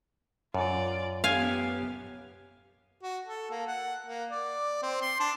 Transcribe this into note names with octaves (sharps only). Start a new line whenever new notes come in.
F#2 F4 D5
B3 G4 F5 G#5
F#4
A4
A#3
F#5
A#3
D5
C4
C6
D4